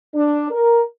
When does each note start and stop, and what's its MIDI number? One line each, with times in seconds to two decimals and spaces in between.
0.15 0.49 62
0.51 0.81 70